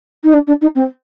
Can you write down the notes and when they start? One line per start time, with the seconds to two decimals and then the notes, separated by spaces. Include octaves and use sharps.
0.24 D#4
0.33 D4
0.47 D4
0.61 D#4
0.75 C4